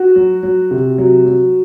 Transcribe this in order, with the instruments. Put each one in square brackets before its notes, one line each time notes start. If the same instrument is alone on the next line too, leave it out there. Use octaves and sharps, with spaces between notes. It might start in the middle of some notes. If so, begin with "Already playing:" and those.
Already playing: [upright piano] F#4
F#3
F#3
C3
F#3
F#3